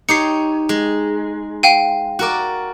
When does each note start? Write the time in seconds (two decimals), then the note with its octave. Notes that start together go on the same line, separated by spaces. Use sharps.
0.09 D#4 G4 C#5 C7 C#7
0.69 G#3
1.63 F5 G5 D#7
2.19 F#4 A#4 D5